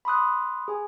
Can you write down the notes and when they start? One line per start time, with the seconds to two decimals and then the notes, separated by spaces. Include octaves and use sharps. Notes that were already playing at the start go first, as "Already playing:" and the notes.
0.05 B5 C6 D#6 F#6
0.68 G#4 G#5